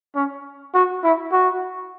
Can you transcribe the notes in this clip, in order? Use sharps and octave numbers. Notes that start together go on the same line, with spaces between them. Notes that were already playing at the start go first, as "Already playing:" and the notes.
C#4
F#4
E4
F#4